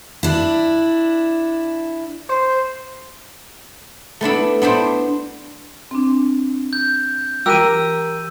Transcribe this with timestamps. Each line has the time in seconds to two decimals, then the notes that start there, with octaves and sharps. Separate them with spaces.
0.23 D4 E4
2.29 C5
4.21 A3 B3 D4 E4
4.62 B3 D4 E4 C5
5.91 C4 D4
6.73 G6
7.46 E3 G4 A#4 E6 F#6 D#7